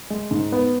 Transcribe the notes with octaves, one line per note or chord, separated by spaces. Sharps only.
G#3
G#2
B3